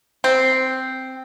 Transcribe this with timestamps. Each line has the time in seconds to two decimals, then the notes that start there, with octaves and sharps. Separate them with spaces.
0.24 C4